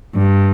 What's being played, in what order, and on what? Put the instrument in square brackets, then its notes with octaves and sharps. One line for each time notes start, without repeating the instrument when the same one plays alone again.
[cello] G2